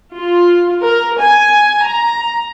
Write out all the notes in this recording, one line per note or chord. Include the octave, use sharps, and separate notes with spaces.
F4
A#4
G#5
A#5